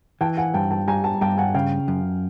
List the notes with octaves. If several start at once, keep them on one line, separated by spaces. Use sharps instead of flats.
E3 G5 A5
F#5 G#5
G2 G5 A5
G5 A5
G3 G#5 A#5
G5 A5
G2 G5 A5
F#5 G#5
C#3 F5 G5
F#2